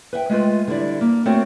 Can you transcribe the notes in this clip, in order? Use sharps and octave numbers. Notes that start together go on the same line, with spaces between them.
B4 E5 F#5 G5
G#3 A3 F4 B4
D3 G3 E4 D5
A#3
A3 C4 F#4 A#4 C#5 F5